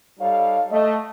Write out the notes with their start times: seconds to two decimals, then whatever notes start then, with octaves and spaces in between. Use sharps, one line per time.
0.20 G3 D#4 A4 C#5 F5
0.71 A3 D#5